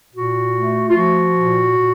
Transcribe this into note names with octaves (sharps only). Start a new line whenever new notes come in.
A#2 F#4
A3
F4
F3 F#4
A#2
A#2